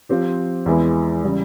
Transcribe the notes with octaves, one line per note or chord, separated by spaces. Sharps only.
F3 C4 G4
E2 E3 G#3 E4
C#3 E3 G3